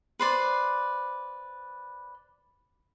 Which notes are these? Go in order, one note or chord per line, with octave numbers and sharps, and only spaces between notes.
B4 C5 D5